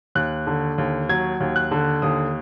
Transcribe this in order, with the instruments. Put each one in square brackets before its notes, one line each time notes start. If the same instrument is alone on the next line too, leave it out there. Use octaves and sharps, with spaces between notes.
[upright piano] D#2 F#6
D3
D#2
F#3 G#6
D#2
F#6
D3
D#2 D#6